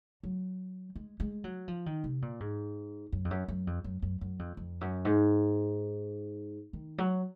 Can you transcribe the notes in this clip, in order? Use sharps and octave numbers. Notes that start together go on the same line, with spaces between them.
F#3
G#3
G#3
F#3
F3
D#3
C3
A#2
G#2
F#2
F2
F#2
F#2
F2
F#2
F#2
F#2
F2
F2
F#2
G#2
D#3
F#3